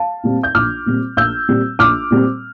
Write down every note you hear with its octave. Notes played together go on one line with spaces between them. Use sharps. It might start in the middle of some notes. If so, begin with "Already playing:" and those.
Already playing: F5 A5
A#2 G3 C4
G6
A#1 D6 F6
A#2 G3 C4
A#1 E6 G6
A#2 G3 C4
A#1 D6 F6
A#2 G3 C4